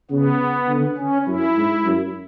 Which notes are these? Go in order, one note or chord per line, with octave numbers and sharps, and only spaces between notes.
C#3 B3
D3
C#4
F#2 E4
G#2
F#2